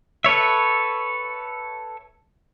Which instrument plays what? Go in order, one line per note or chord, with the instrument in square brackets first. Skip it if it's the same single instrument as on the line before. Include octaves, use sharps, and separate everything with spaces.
[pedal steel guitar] A4 B4 C#5 E5